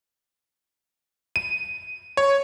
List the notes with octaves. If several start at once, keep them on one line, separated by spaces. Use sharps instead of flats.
D#7
C#5